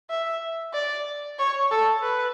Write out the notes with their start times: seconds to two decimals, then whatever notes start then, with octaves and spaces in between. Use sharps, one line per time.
0.10 E5
0.74 D5
1.39 C#5
1.71 A4
2.03 B4